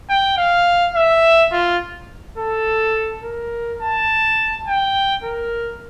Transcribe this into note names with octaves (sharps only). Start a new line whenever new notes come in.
G5
F5
E5
F4
A4
A#4
A5
G5
A#4